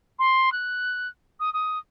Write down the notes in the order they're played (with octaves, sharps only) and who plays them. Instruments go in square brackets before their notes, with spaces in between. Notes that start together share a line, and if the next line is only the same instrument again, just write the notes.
[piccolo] C6
F#6
D#6
D#6